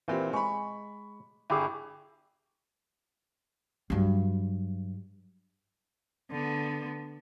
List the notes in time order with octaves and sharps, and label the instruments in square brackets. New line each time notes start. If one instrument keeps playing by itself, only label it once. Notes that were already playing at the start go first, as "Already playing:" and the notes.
[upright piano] A#2 C4 G4 [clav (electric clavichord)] E3
[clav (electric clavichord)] G#3 [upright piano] B5 C#6
[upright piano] G1 G#4 [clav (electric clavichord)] E4 G4
[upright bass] G2 F#3
[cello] D3 B3